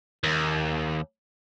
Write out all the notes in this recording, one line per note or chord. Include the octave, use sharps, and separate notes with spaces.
D#2